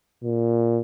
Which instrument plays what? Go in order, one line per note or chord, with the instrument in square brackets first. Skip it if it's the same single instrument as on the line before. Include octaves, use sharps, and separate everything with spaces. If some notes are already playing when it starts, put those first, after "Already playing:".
[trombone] A#2